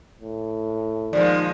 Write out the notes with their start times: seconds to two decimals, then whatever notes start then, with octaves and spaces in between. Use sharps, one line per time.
0.21 A2
1.13 A#2 D#3 F3 G#3 D5